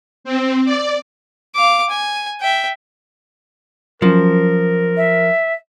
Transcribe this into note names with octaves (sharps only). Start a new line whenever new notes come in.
C4
D5
F5 D6
G#5
E5 G5
F3 F#3 C#4 A#4
E5